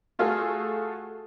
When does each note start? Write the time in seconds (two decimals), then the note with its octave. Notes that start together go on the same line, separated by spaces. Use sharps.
0.19 A3 F4 F#4 G#4 A4